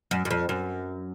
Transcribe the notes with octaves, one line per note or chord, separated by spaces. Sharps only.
F#2
F#2
F2
F#2